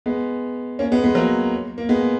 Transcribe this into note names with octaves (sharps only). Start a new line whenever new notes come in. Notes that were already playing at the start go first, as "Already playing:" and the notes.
G#3 B3
A#3 C#4
G#3 B3
G#3 B3
F#3 A#3
A#3
G#3 B3